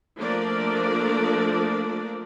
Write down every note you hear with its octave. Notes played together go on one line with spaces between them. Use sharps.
F3 A3 A#3 D4 A#4 D5